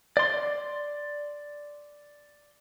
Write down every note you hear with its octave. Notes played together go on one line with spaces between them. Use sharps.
D5 C6